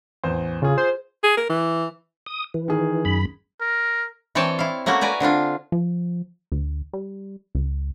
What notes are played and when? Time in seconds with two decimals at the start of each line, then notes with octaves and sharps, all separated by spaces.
0.24 A1 E2 C5
0.62 C#3 F4 G#4
0.78 C5
1.23 G#4
1.37 A#4
1.50 E3
2.26 D#6
2.54 E3
2.68 D#3 G#4
3.05 F#2 B5
3.61 A#4
4.35 E3 C4 C#5 D5 G5 A5
4.59 E4 F5
4.86 A3 A#3 C#4 E4 F#4
5.01 B4 D5 G#5 A#5
5.20 D3 C4 D4 F4
5.72 F3
6.52 D2
6.93 G3
7.55 C#2